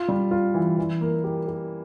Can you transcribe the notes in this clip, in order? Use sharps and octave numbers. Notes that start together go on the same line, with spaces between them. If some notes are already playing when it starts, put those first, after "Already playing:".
Already playing: F4
G3
F4
E3
E3
A#3
G4
G4